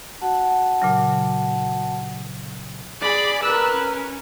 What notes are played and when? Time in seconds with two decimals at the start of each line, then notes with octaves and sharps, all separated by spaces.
0.21 F#4 F#5 A5
0.82 A#2 C#3 F#3
3.01 G#4 D5 B5
3.43 A#4 B4 E6 F#6
3.74 C#4